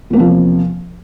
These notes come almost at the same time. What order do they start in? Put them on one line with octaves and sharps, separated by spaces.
E2 A#3 C3 F3